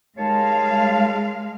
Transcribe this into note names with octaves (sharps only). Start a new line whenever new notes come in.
D#2 G#3 C#5 F5 A5